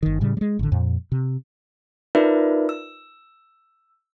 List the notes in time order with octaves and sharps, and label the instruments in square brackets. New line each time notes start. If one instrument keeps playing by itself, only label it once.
[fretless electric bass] G1 D#3
A2 C#3 G3
G3 G#3
A1 D3
F2 A#2
C3
[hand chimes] D#4 F4 A#4 B4 D5 E5
E6